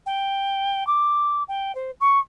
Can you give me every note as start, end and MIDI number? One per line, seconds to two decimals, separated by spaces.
0.06 0.86 79
0.87 1.43 86
1.48 1.75 79
1.75 1.91 72
2.00 2.19 85